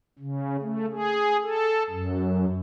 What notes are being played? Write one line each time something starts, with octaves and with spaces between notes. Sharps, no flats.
C#3
A3
G#4
A4
F#2